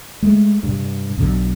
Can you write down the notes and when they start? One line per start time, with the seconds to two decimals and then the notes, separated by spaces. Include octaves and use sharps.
0.22 G#3 A3
0.63 G2 C3
1.17 B1 F#2 D3